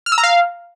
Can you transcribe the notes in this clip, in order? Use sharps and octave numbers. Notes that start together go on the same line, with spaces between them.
F6
E6
A#5
F5